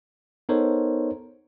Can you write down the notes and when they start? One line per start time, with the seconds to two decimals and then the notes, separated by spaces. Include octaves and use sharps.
0.49 B3 D#4 A4 A#4 C5 C#5